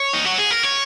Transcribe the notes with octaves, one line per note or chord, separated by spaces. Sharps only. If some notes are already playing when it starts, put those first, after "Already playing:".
Already playing: C#5
D#4
F#4
G#4
A#4
C#5